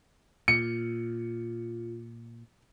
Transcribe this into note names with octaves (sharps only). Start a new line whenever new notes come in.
A#2 F4 C#7